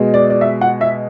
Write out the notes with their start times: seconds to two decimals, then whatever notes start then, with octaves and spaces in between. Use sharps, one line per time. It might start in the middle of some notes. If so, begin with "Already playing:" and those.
Already playing: B2 G#3
0.14 D5
0.30 D5
0.41 E5
0.61 F#5
0.81 E5